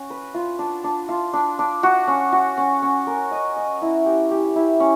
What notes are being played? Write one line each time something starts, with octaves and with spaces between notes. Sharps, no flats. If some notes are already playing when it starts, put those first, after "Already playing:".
Already playing: C#4 F#4
B4
F4
D4
D4
F4
D4
D4
F#4
C#4
F#4
C#4
C#4
A#4
D#5
D#5
E4
G4
G4
E4
C#4